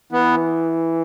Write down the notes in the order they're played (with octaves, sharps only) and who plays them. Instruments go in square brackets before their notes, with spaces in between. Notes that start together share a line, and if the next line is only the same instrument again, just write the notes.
[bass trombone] E3 [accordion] B3